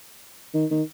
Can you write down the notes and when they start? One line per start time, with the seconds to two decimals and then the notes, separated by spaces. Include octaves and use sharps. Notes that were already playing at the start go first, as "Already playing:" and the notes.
0.54 D#3
0.71 D#3